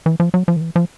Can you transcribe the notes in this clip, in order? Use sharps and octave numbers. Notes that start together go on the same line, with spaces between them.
E3
F3
F#3
F3
D#3
E3
F3